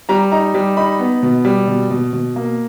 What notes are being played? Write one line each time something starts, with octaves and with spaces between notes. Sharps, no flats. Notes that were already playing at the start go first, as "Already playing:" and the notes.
G3 A#5
D#4 A#5
G3
D#4 B5
B3
B2
G3
B2
B2
B2
A#3